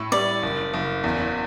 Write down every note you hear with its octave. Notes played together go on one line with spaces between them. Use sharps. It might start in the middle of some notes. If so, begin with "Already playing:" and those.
Already playing: A2
G3 D5
F#1
F#1
E2